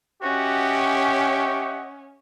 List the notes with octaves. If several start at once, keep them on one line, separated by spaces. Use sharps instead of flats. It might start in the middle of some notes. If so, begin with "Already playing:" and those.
C#4 F#4 G4 D#5 E5 F#5
C#6